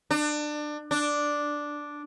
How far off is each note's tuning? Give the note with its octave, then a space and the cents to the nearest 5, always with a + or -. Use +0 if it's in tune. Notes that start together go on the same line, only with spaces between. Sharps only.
D4 +25
D4 +0